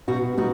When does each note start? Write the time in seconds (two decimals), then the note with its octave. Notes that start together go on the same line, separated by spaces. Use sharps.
0.08 B2 D#4 F#4
0.37 B2 D#4 F#4